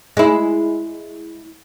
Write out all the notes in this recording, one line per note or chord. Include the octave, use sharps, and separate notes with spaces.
G#3 E4